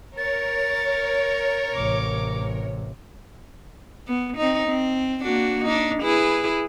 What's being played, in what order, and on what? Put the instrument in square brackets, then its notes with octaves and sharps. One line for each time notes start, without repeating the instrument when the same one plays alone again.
[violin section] A#4 C#5 [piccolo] A6
[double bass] A1 C3 [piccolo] D6
[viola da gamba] B3
C4 D#4
C4
A#3 D4 F#4
D4 D#4
E4 G#4 B4